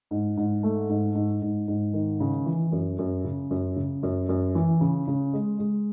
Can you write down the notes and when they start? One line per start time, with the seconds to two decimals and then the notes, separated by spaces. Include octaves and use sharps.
0.11 G#2
0.37 G#2
0.63 A3
0.89 G#2
1.15 G#2
1.42 G#2
1.68 G#2
1.94 D#3
2.20 C#3
2.46 E3
2.72 F#2
2.99 F#2
3.24 C#3
3.51 F#2
3.76 C#3
4.03 F#2
4.29 F#2
4.55 E3
4.81 C#3
5.08 C#3
5.33 G#3
5.59 G#3